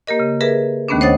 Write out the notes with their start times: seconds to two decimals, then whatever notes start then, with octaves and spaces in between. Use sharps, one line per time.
0.07 A#3 G4 A#4 D#5
0.20 C#3
0.41 G#4 A#4 B4 E5
0.88 D#2 D#3 A3 B3 C#4 D4
1.01 C5 C#5 D#5 F#5 D#6 A6